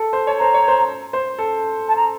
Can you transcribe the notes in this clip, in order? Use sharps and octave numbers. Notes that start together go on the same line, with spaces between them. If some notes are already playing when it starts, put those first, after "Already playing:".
Already playing: A4
C5
C#5 A5
C5 A#5
C#5
C5
C5
A4
A5
A#5